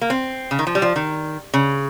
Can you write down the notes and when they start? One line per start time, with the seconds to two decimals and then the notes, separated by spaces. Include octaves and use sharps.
0.01 A#3
0.10 C4
0.51 C#3
0.59 D#3
0.67 F3
0.75 G3
0.82 F3
0.96 D#3
1.54 C#3